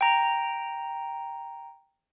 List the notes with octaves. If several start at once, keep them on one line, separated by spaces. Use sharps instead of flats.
G5 A#5